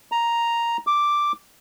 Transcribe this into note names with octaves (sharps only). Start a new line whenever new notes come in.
A#5
D6